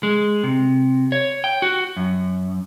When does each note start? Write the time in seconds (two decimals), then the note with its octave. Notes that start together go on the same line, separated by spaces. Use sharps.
0.03 G#3
0.43 C3
1.12 C#5
1.44 G5
1.62 F#4
1.97 F#2